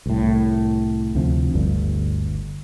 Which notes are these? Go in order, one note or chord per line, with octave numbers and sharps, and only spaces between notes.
C2 A2
D2 C3 F3
G1 D2 G2